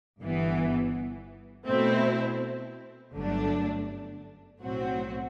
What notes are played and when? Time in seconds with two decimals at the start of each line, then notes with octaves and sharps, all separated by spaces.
0.20 G1 G2 E3 B3
1.67 B2 A3 C4 E4
3.14 G1 F#2 D3 A3 D4
4.61 B1 A2 F#3 C4 F#4